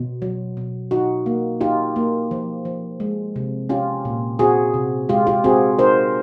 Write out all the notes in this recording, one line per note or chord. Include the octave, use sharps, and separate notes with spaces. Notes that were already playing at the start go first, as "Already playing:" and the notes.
Already playing: B2
F#3
B2
D#4 F#4
A#3
D#4 F4 G4
A#3
F3
F3
G#3
C3
C#4 F4 G4
A#2
C4 F#4 G#4
C3
G#3 F4 G4
F4 G4
C4 F#4 G#4
D#4 A#4 C5